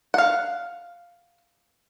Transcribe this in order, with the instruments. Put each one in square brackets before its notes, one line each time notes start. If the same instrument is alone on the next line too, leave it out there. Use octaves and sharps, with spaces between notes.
[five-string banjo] F5 F#5